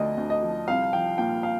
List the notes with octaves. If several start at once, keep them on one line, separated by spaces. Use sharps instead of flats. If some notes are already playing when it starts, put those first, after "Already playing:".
Already playing: D2 D3 F3 D5 D#5
D2
D#5
F3
C2 F5
F3 G5
A#2 G5
F5